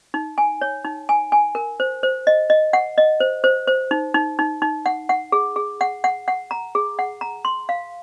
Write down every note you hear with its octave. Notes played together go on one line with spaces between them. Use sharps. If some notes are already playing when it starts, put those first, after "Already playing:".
D#4
G#5
C#5
D#4
G#5
G#5
A#4
C5
C5
D#5
D#5
F#5
D#5
C5
C5
C5
D#4
D#4
D#4
D#4
F#5
F#5
G#4
G#4
F#5
F#5
F#5
A#5
G#4
F#5
A#5
C6
F5